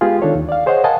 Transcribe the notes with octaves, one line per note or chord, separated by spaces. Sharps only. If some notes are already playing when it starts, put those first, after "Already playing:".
G#3 B3 F4 G4 G#4
D#3 D4 D#4 F4 A4 C#5
D#2
D5 F5
G#4 C5 C#5 D#5 F#5
A#4 D#5 F5 F#5 G#5 A5